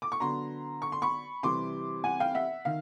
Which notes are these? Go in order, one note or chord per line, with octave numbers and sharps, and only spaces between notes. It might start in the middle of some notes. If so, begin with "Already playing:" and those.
D6
C#6
D3 F#3 B3 A#5 C6
C#6
C6
B5 C#6
C3 E3 G3 C6 D6
F#5 G#5
F5 G5
E5 F#5
D#3 F5